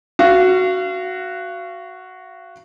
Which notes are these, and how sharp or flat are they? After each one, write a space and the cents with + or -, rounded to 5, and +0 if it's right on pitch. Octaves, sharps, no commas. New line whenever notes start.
F#4 +0 F5 -35